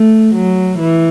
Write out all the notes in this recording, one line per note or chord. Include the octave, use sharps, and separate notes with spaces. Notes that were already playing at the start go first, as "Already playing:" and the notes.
Already playing: A3
F#3
E3